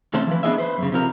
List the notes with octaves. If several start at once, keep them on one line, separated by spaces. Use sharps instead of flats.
E2 C3 A3 C#4 A4 C5
E3 F3 B4
B3 D4 G4 G#4 D#5 E5
B4 C5
F#2 C#3
C3 F3 A#4